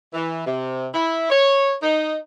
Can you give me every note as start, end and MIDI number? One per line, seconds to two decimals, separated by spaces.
0.13 0.42 52
0.46 0.87 48
0.93 1.28 64
1.30 1.74 73
1.82 2.16 63